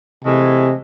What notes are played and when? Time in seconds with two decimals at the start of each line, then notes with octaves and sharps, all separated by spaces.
0.24 C3 E3 G#3 A3